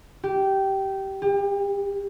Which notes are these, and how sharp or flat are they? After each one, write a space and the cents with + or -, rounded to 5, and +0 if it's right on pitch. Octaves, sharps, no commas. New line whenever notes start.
G4 -15
G4 +35